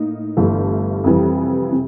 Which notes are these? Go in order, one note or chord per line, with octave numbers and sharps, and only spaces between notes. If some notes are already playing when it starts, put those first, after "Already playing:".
Already playing: A2 A#3 D#4
G1 G2 E3 A3
F2 C3 E3 G3
C3